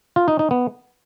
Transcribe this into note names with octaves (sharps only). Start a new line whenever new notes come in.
F4
D#4
D#4
B3